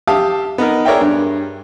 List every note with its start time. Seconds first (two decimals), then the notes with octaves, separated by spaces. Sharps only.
0.07 G4 E5 F5 A5 D#6
0.58 B3 D#4 A#4
0.85 G#4 A#4 C#5 D5 E5 G5
1.01 G2